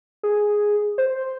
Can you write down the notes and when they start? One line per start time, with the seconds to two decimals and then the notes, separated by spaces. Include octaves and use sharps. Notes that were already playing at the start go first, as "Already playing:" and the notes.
0.23 G#4
0.98 C5